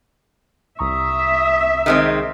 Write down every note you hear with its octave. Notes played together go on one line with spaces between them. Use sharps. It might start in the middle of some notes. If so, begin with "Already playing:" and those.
C2 E5 A#5 C#6 D#6
D#3 G#3 C4